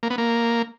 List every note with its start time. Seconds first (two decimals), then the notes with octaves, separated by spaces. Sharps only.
0.03 A#3
0.10 B3
0.18 A#3